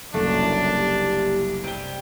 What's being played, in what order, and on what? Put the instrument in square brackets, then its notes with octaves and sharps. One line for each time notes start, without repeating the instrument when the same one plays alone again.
[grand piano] F#1 C2 A#3 [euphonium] F#2 [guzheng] A3 [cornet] D4
[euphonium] G4
[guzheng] C3 G3 [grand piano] D7 G7